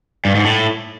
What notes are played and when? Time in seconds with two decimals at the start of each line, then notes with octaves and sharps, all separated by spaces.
0.25 G2
0.35 G#2
0.45 A2